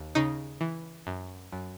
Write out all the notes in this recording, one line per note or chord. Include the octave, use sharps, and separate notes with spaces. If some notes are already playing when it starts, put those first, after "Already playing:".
Already playing: D#2
C#3 D#4
E3
F#2
F#2